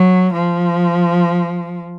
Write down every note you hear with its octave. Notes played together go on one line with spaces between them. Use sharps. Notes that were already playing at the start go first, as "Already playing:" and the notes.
Already playing: F#3
F3